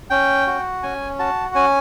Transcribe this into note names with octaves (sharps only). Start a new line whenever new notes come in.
C#4 G5
F#4
C#4 G#5
F#4 A5
C#4 G#5